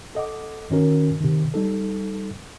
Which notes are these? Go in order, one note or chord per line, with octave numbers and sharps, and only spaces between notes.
A4 D#5 F#5 D6
D#3 C#4 F#4 A#4
C3 D#3
G3 D#4 A4